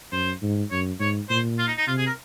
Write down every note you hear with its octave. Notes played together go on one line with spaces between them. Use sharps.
F#2 C5
G#2
F#2 C#5
G#2 C#5
A#2 C5
F4
D#4
D#4
C3 F4
G#4
A#4